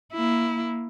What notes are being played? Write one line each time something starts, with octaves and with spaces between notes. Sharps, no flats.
A#3 E4